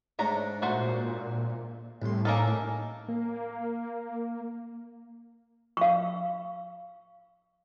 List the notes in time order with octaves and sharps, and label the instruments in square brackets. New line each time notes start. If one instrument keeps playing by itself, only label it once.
[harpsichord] G#2 D4 C#5 [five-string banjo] A3 A#5
[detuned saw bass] A#2 [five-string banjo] A3 F#4 C5
[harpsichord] C2 C6 [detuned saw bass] A2
[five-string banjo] A#3 D#4 A4 [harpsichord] C#4 A#4
[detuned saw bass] A#3
[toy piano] F5 C#6